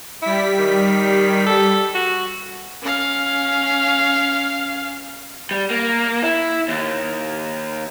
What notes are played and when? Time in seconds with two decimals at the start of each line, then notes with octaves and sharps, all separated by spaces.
0.22 G3 E4 B6
0.58 D#3
1.47 A4
1.94 F#4
2.82 C#4 F5
5.51 G3
5.70 A#3
6.23 E4
6.68 D#2